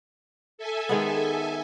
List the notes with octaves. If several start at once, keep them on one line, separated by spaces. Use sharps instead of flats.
A4 E5 G#5
D#3 G#3 B3